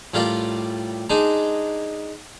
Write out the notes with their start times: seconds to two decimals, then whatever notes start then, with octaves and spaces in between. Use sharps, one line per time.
0.14 A2 G3 F4 A#4 D5
1.10 G#3 D4 D#4